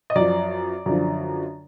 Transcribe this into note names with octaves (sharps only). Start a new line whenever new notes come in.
D#5
F#2 F3 D5
F#2 D3 F3